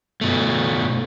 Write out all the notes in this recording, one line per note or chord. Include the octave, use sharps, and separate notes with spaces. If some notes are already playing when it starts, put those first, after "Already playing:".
B2 A3